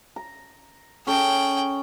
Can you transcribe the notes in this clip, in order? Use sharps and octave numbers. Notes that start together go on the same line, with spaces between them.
A#5
C#4 G#4 A4 G5